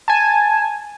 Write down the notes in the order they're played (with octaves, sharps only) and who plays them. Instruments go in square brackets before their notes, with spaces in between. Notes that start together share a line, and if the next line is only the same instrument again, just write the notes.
[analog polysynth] G#5 A5